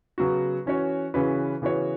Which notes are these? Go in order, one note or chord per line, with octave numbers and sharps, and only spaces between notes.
C#3 F#3 B3 F#4
E3 C#4 F#4 C#5
C#3 E3 C#4 F#4 B4
C#3 E3 B3 F#4 C#5